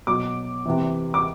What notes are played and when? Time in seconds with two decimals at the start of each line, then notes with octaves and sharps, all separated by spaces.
0.07 B2 F#3 D6
0.65 C3 E3
1.14 D6